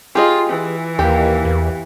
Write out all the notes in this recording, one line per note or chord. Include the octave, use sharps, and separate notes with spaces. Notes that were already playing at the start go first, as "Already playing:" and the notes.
F4 G4 G#4 D#5
E3
D#2 A#3 G4
E2